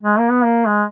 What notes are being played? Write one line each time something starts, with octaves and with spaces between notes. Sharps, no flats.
G#3
A#3
B3
A#3
G#3